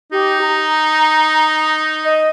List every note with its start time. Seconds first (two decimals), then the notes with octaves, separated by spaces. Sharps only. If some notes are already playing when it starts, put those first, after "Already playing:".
0.12 D#4 G4
0.41 A#5
2.05 D#5